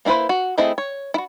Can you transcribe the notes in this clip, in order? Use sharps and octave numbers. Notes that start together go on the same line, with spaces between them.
A#3 D4 E4 B4 C5
F#4
A3 C4 E4 G#4 D#5
C#5
E4 F#4